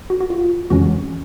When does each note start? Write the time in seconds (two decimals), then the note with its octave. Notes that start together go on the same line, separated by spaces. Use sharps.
0.10 F#4
0.20 F#4
0.30 F4
0.70 F2 C#3 E3 G#3 C#4 F#4